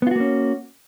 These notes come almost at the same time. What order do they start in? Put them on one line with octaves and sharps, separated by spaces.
B3 F4 F#4 A#3 C#4